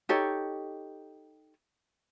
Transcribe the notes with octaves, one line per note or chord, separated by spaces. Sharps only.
D#4 G4 A4 C#5